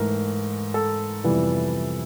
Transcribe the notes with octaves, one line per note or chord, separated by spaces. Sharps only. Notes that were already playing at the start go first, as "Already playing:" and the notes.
Already playing: G#2 E3 A3 A#4
A4
F2 C3 E3 G3 B3